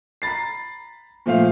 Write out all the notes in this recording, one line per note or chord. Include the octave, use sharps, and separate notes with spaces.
A#5 B5 A6 C7
A#2 F3 A3 F5